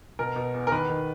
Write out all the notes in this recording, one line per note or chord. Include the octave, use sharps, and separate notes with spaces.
B2 A#4
B2
E2
A#4
D#3 B4
D#3